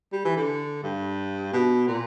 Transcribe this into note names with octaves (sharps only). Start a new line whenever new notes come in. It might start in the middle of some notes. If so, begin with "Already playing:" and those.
G3
E3
D3
G2
B2
A#2